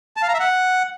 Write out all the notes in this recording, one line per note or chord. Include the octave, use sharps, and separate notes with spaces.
A5
F5
A#5
E5
F#5